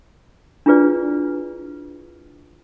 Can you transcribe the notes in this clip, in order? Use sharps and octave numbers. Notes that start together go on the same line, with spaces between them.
D4 E4 F4 G#4 B4 D5